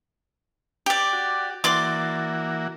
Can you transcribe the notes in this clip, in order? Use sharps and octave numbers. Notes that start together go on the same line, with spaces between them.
G4 D5
F#4
E3 A#3 F#4 D5 C6 D6